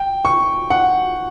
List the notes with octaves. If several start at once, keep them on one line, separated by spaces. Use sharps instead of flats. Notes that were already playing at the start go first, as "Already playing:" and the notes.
Already playing: G5
C#6
F#5